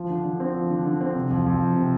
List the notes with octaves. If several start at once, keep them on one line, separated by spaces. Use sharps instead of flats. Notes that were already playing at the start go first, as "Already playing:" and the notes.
Already playing: F3
D3
D3
C4
F3
D3
D3
C4
C3
F2
F2
F3
C3